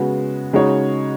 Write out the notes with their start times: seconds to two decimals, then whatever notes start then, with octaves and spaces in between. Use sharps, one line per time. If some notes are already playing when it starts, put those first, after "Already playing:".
Already playing: C#3 G#3 B3 F#4
0.53 C#3 G#3 D#4 F#4 C#5